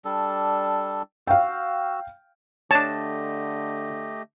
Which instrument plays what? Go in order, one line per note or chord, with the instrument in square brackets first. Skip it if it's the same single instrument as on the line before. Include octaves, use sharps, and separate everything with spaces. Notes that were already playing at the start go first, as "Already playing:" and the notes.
[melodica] G3 D4 A4
[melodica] F#4 E6 [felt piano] F5 G5
[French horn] D3 [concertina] A3 G4 D#5 [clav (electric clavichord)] D4 C#5 [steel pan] A5